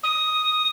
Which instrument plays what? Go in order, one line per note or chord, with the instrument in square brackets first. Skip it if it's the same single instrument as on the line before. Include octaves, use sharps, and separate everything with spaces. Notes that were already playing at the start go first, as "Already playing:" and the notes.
[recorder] D#6